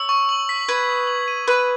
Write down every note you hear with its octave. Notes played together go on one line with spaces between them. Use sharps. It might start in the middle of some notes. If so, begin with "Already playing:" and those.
Already playing: C#5 E6
C#6
F#7
B6
B4 G#6
D#6
F#7
D#7
B4 D#7